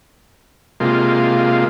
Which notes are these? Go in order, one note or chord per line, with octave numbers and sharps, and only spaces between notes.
C3 G#3 A#3 F4